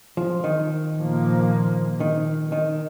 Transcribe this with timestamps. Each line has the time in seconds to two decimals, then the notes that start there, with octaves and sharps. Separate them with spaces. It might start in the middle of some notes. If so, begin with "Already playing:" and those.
0.17 F3
0.44 D#3
0.95 A#2 F3 A#3
2.00 D#3
2.52 D#3